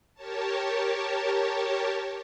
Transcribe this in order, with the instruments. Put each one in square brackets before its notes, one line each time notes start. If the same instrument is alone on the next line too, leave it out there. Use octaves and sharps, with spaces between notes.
[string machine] G4 A#4 C#5 A5